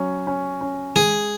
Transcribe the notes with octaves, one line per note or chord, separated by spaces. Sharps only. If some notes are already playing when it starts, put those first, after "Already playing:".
Already playing: F#3 C#4
C#4
C#4
G#3 G#4